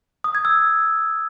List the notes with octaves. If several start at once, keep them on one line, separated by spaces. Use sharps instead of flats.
D#6
G#6
E6